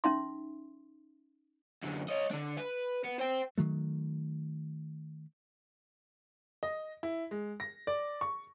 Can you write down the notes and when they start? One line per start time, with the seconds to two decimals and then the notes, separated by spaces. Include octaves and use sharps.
0.04 C#4 D#4 E5 C6
1.83 F#2 D3
2.09 C#5 D#5
2.31 D3 D4
2.57 B4
3.04 B3
3.20 C5 G5
3.58 D#3 F#3 A3
6.63 D#5
7.03 E4
7.31 G#3
7.60 A#6
7.87 D5
8.21 C#6